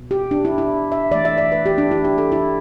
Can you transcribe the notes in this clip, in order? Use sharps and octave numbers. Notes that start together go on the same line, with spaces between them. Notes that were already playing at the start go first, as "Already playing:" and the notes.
Already playing: B2 B3
G4
D4
E4
E4
E5
E3 A3 D5
E5
D5
B4
G4
D4
E4
G4
A4
E4